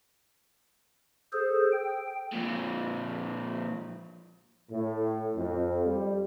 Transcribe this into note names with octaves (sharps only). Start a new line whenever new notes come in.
G#4 A4 C5
G5
F2 A#2
A2
F2
G3